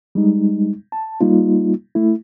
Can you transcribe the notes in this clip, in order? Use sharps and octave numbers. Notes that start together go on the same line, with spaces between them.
G3 G#3 D#4
A5
G3 A#3 D#4 F4
A3 E4